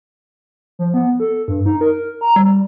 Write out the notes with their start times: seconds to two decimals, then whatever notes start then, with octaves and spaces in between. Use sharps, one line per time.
0.79 F3
0.94 B3
1.20 A4
1.48 G2
1.66 D#4
1.81 A#4
2.21 A#5
2.36 G3